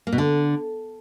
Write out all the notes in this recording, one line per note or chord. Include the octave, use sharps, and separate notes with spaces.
A#3
B2
D3